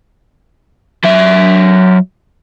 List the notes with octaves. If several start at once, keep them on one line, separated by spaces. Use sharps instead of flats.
F#3 E5